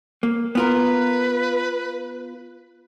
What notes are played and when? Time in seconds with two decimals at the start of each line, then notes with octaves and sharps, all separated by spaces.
0.23 A#3
0.55 B3 F4 A#4 B4